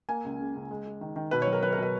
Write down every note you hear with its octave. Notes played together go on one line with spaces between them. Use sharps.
A#3 G#5
C#2
C#3
C#2
G#3
G#3
D#3
D#3
B2 B4
C#5
F#3
A#4
F#3 B4
A#4
B2 B4